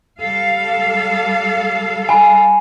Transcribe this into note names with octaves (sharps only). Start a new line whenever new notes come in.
G3 A4 F5
G#5 B5